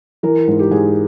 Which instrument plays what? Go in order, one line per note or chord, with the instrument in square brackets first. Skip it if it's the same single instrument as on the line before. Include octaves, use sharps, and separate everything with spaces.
[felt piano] E3 A#4
G#2
G4
G#2 G#4